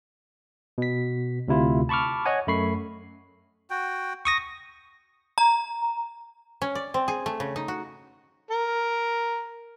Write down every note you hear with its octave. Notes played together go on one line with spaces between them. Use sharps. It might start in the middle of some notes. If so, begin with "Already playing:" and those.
B2 B6
D2 C3 E4 F4
A5 B5 C#6 D6 F6
C#5 D#5 F#5 G#5
F#2 A3 B5 C#6 C7
F#4 G5
C#6 D#6 A#6
A#5
C#4
D5
C4
G#4
A3
C#3
D#4
F#4
A#4